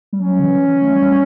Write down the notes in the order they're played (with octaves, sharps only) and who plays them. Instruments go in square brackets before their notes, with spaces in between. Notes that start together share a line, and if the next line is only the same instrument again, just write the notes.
[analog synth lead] G3
[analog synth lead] F#3 [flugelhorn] C#4
[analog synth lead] D3
E3
E3
A3
G3